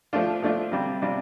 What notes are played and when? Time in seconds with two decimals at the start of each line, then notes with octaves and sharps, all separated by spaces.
0.13 F3 A3 D4 F4
0.42 F3 A3 D4 F4
0.72 C3 G3 D4 F4
1.02 C3 G3 D4 F4